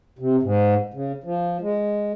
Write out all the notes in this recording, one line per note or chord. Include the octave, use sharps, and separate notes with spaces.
C3
G#2
C#3
F3
G#3